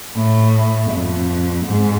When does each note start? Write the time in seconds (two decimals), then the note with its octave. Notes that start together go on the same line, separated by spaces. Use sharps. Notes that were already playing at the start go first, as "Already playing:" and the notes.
0.16 A2
0.91 F2
1.66 G#2